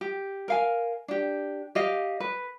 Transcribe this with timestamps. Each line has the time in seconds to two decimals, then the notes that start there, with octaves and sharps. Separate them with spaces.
0.01 G4
0.48 A#4 F5 G#5
1.08 D4 G4
1.75 G4 D#5 F5
2.20 B4